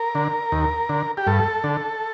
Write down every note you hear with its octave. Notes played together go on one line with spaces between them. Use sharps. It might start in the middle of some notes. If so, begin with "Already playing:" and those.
Already playing: A#4
D3
D#2
D3
G4
G2 A4
D3